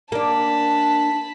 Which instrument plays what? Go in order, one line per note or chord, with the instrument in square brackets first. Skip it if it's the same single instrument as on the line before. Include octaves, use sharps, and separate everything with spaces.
[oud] A#3 D4 [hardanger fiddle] A5 B5